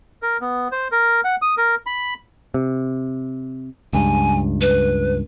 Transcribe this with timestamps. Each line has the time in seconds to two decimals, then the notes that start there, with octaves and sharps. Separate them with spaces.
0.22 A#4
0.41 B3
0.72 C5
0.92 A#4
1.24 F#5
1.42 D#6
1.57 A#4
1.86 B5
2.54 C3
3.93 C#2 G2 G#5
4.61 B4